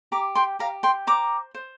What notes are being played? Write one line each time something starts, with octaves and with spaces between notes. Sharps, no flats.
G4 A#5 D6
G5 C6
G4 F5 A#5
G5 C6
C5 A#5 D6
C5